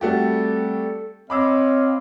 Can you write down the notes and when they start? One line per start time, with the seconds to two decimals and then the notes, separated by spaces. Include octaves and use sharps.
0.01 G3 A3 C4 F#4 G4 A4
1.30 C4 C#5 D#5 F5 B5 D6 E6